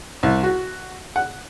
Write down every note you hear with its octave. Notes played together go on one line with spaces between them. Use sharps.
C2
F#4
F#5